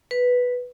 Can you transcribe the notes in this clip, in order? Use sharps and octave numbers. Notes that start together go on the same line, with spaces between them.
B4